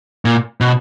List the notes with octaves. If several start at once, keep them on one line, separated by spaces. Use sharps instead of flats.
A#2
B2